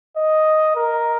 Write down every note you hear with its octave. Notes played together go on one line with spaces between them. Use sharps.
D#5
A#4